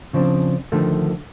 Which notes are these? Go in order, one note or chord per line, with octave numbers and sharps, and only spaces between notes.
C#3 F3 C4 D4
D3 D#3 F3 A3